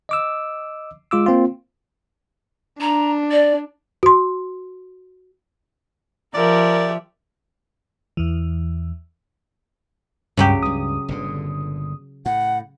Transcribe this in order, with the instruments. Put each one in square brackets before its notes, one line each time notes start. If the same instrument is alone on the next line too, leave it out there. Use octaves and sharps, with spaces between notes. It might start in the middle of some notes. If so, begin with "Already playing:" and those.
[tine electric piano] D#5 D6 E6
G#3 F4 D6 E6
A#3 C4 F4
[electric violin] D4 [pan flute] A#5
[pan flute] D5
[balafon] F#4 C6
[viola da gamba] F3 [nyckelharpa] G4 E5 [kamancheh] A#4 [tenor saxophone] D5
[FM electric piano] E2 E3
[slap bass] C#2 G3 [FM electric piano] G2 G5 [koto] C#3 F#3 G4
[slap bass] C#2 G2 [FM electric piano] D#6
[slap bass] G1 A#2 D3
[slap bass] A2 [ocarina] F#5